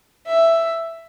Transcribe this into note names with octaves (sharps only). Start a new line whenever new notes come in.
E5